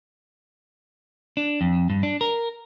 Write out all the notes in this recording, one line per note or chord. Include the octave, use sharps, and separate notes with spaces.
D4
F2
G2
D4
A#4